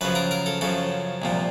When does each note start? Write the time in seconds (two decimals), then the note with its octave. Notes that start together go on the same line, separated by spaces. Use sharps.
0.01 F#2 C#3 F3 B4
0.15 A#4
0.31 A#4
0.46 A4
0.61 F#2 C#3 F3 A4
1.22 C2 A#2 F3